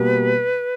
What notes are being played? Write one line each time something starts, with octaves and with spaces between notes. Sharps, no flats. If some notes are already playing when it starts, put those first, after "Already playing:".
Already playing: B2 G3 A#3 B4